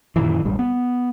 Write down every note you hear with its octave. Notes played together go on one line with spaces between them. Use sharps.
F#2 A#2 D#3 E3
E1 A1 G2 G3
B3